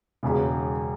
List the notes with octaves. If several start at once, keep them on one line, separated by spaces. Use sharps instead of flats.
E1 E2 C#3